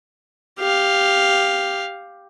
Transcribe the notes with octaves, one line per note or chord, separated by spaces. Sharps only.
G4 F5